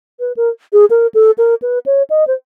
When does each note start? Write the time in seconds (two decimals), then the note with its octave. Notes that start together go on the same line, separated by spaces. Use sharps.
0.20 B4
0.37 A#4
0.73 G#4
0.90 A#4
1.14 A4
1.38 A#4
1.62 B4
1.86 C#5
2.10 D#5
2.27 C5